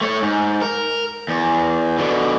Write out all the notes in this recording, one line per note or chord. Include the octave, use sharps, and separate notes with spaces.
A3 C#5
G#2
A#4
E2
B2 D3